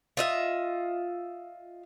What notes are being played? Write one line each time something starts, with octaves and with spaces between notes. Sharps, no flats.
F4 D#5 E5